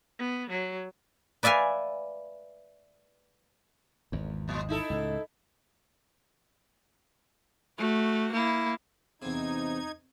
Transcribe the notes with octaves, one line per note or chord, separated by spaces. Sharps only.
B3
F#3
B4 D5 E5 F5 G#5
G#1 E2
A#2 F#3
D#4 E4 A4
C#2 A2
A3 F#4
A#3 E4
E2 C3 D#4 G#6